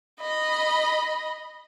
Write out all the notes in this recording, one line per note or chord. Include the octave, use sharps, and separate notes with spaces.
D#5 B5